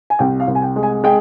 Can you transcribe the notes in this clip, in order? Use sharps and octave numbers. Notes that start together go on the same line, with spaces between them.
G#5
C2 G5
F5
C2
G#5
G5
G#3
G#5
G#3 G5